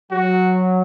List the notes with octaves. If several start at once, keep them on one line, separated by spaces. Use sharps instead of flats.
F#3 F#4